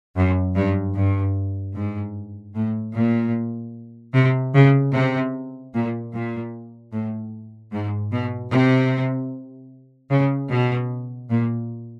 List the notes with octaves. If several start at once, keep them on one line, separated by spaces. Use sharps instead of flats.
F#2
G2
G2
G#2
A2
A#2
C3
C#3
C3
A#2
A#2
A2
G#2
B2
C3
C#3
B2
A#2